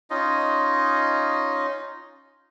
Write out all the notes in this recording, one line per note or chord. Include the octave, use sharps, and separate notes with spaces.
C#4 D#4 F4 D#5